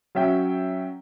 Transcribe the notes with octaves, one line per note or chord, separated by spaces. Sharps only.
F#3 C#4 E5 G5